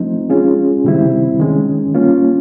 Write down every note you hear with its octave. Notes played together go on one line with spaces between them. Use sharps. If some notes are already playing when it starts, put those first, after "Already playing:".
Already playing: F3 A3 C4 D#4
G#3 C#4 F4 G#4
C3 D#3 G3 C4 E4
D#3 G#3 C#4
G3 A#3 C#4 F4